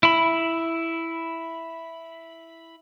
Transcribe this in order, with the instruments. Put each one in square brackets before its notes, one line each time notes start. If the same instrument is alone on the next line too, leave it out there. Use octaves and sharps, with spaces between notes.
[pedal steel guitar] E4 B5